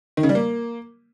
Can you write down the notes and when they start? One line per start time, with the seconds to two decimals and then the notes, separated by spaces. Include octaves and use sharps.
0.17 D#3
0.23 C#3
0.29 G3
0.35 A#3